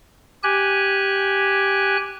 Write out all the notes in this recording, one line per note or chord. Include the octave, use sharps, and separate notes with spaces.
G4 G#5 F#6